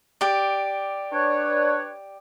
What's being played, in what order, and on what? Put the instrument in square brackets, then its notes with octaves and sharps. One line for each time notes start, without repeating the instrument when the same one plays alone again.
[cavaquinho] G4 D5
[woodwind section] D4 B4 C#5